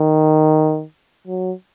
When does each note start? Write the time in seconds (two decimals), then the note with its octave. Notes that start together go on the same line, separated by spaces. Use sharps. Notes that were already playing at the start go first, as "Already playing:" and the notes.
Already playing: D#3
1.27 F#3